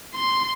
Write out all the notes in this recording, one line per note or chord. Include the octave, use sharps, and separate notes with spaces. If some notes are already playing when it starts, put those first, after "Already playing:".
C6